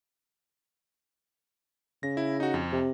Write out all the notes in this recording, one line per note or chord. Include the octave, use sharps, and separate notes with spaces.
C#3 A#6
E4
D#4 F#4
F2
C3